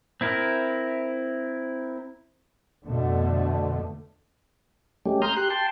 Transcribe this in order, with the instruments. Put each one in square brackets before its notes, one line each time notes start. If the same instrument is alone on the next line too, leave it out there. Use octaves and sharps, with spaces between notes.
[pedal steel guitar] C4 E4 A#4
[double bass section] F2 B2 D3 A3
[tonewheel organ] G#3 A3 C#4 G4
A#5 C6 D#6 F6 G6
G4 C6 F#6
G5 A5 C6